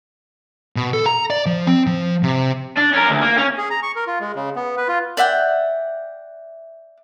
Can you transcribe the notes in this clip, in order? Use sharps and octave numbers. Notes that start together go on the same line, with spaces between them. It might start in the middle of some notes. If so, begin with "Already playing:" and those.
B2
A4
A#5
D5
F3
C4
F3
C3
D4
C#4 A#4
D2
A#3
C#4
G#4
A#5
C#6
A#4
F4
G#3
C#3
B3
B4
F4
D5 E5 F#5 G5